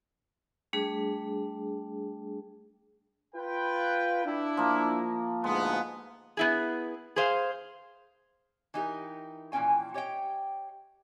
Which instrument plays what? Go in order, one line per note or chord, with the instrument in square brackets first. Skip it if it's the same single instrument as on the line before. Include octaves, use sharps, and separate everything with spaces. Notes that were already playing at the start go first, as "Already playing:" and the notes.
[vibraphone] G3 A3 D4 G#4
[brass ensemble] F4 B4 G5
D4 E4
[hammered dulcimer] F3 A#3
[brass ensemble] D2 G#2 B3 [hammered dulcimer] G#3
[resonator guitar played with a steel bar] B3 E4 G#4
G#4 C5 F5
E3 D#4 G4 A#4
A#2 E3 F3 C#4 G5 G#5
G4 C#5 D#5 G5